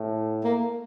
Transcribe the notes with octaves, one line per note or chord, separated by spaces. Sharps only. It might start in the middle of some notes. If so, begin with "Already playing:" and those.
Already playing: A2
A#3